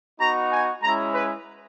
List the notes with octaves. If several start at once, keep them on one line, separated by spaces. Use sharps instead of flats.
B3 D#4 F#4 A#5
G#5
G#3 C#4 E4 A#5
B4